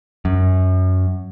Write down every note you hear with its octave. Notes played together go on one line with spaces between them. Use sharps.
F#2